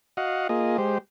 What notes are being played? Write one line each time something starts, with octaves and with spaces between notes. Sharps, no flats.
F#4 D#5 F5 F#5
A#3 F4 G#4 D#5
G#3 G4 C5